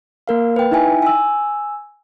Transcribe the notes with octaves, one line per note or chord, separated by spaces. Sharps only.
A#3 A#4 F5
B4 G5
D#4 E4 E5 G5 G#5
G#5 E6